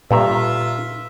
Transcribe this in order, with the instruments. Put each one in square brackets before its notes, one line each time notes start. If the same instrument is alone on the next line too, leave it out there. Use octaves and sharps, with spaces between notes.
[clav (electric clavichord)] G2 A4 A#5 [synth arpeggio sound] A#2 [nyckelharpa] F4 E5